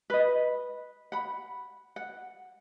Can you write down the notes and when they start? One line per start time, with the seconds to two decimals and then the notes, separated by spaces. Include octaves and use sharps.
0.10 B4 D#5
1.12 F#5 B5
1.96 F#5